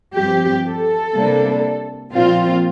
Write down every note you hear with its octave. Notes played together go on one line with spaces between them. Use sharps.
G2 F3 C4 G4
A4
C3 G3 A#3 D4
A#2 F3 C4 F4